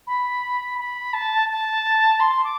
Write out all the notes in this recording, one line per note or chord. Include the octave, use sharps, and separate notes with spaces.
B5
B5
A5
A5
C6
D6